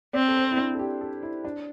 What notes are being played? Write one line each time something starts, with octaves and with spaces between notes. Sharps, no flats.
C4 D5
A4
C5
E4
D4
A4
G4
A4
E4
D4